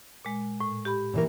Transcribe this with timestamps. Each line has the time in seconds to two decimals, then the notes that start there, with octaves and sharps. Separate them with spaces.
0.25 A#2 G#3
0.60 A2
0.85 G4 B5
1.14 A#2 E3 A#4